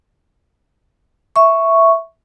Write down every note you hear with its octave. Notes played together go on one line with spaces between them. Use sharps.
E5 C#6